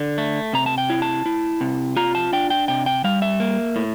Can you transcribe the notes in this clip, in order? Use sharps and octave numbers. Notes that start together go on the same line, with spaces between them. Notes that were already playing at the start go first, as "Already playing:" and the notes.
Already playing: D3
A3
C3 A#5
A5
G5
E4
A5
E4
C3
F4 A#5
A5
D4 G5
G5
C3 G5
G5
G3 F5
E5
A#3
A2